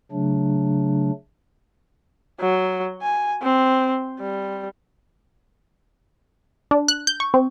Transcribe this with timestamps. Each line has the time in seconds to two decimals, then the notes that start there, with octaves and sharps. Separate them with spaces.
0.12 C#3 F#3 A3 D4
2.40 F#3
3.02 G#5
3.43 C4
4.20 G3
6.71 D4
6.88 F#6
7.07 G6
7.20 C#6
7.34 C4